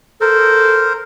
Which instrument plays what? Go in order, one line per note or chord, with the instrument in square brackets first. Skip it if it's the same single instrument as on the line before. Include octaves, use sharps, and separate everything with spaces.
[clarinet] A4 [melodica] A#4 C5